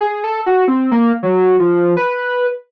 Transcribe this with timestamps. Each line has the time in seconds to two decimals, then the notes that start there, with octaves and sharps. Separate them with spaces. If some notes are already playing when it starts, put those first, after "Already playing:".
0.01 G#4
0.24 A4
0.46 F#4
0.68 C4
0.91 A#3
1.23 F#3
1.59 F3
1.97 B4